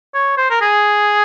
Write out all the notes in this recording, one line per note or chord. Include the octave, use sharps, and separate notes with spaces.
C#5
C5
A#4
G#4